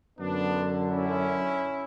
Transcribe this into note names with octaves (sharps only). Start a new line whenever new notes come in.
F#2 D3 B3 D4
C#4 E4